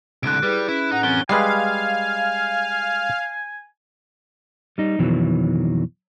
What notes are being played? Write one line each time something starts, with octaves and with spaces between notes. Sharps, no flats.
C2 D3 F#6 D7
G3 E4 G#4 B4
C#4 E4
A2 D#4 F#5
E3 C4 C#4 A#4 A6 G7
G3 G#3 B4 F5 G#5
G3 D#4
F2 B2 D#3 E3 F#3